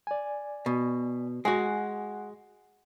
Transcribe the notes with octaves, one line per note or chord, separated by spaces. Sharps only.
D5 G#5
B2
G#3 F#4 F#5 G#5